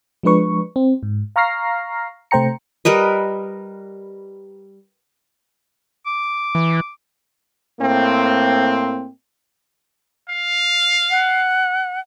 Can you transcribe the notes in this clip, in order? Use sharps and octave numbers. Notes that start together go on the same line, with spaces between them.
F3 G#3 D4 B4 C#6
C4
G#2
F5 A#5 C#6 F6 A#6 C7
C3 A3 C5 G5 A#5 C#7
G3 A#4 B4 D#5
D6
E3
A2 A#3 C4
F5
F#5